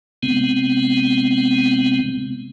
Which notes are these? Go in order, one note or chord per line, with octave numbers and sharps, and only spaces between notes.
C3 G#3 B3 C4